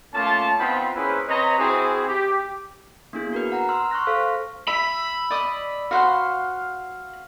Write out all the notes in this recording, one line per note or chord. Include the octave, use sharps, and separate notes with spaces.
A3 A#3 C#4 F4 A5
B3 C4 D#4 F4 G5 B5
A#3 C#4 E4 G#4 B4 C5
C4 B4 C#5 D#5 A#5
C4 E4 F#4 G#4
G4
A#3 B3 D4 E4 G#4
F#4 A#4 B4
F#5 A#5
C6 E6 F6
C6 C#6 F6 F#6 A#6
A4 C5 F5 F6
E5 B5
D5 D#5 D#6
F#4 C5 F5 F#5